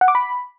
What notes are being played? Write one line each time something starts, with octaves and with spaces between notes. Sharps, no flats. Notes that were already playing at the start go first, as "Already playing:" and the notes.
F#5
D6
B5